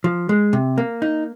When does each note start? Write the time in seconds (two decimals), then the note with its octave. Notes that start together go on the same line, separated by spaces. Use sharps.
0.04 F3
0.29 G#3
0.53 C3
0.78 A#3
1.02 D#4